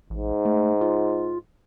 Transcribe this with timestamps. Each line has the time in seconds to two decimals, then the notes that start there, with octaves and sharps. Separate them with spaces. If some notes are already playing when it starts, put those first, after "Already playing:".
0.10 A1 G#2
0.45 A3
0.81 F4